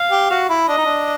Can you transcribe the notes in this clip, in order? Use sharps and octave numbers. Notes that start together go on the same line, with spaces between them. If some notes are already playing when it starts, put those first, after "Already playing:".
Already playing: F5
G4
F#4
E4
D4 D#5
D#4
D4